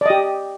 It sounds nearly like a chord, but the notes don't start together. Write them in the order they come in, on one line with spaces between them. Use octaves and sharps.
D5 D#5 G4